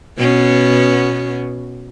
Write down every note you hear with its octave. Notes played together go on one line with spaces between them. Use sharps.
B2 B3 C#4